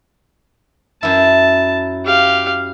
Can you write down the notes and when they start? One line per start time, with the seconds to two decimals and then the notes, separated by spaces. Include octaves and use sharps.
1.03 F#2 E4 A5
2.05 G4 F5